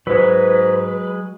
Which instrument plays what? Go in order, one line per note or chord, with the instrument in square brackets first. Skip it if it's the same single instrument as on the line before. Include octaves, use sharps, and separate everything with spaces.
[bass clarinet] G#2 [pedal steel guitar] F#3 G#3 [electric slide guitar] B4